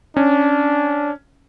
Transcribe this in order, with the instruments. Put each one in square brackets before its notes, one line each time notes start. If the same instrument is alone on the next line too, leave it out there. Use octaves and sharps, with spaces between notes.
[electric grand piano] C#4 [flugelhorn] D4